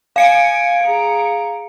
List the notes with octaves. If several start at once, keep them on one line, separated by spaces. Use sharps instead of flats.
F5 G#5 C#7 D7
G#4 A#5